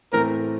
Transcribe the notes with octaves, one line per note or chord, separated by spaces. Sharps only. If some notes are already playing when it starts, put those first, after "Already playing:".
A2 E3 A3 C4 A#4